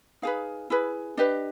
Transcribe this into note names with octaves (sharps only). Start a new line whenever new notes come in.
D#4 G#4 B4 F5
E4 G#4 B4
D4 G4 B4 D#5